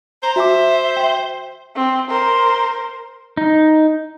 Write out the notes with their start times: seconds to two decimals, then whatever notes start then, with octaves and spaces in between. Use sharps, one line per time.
0.23 C5 A#5
0.36 F#4 E5 G#5 D6
0.97 G5 C6
1.76 C4
2.09 A#4 C5
3.37 D#4